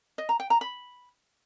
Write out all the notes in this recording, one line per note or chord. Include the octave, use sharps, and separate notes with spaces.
D#5
A#5
G5
A#5
B5